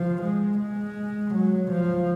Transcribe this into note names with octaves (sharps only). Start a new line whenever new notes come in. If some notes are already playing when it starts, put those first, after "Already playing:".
Already playing: F3
G#3
G#3
F#3
F3